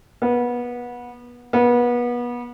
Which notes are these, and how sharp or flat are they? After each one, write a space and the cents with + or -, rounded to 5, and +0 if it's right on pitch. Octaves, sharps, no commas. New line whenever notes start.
B3 -25
B3 -30